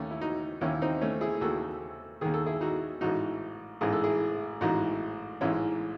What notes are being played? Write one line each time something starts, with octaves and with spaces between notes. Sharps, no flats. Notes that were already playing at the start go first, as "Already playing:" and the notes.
Already playing: D#2 D#3 A3 C#4
E4
D#4 F#4
D#2 D#3 C#4 E4
C4 D#4
A3 C#4
E4 G#4
D#2 D#3 F#4 A4
D#2 D#3 G#4
A4
E4 G#4
D#4 F#4
A1 G#2 E3 D#4 F#4
A1 G#2 E3 G#4
A4
E4 G#4
A1 G#2 E3 D#4 F#4
A1 G#2 E3 C#4 E4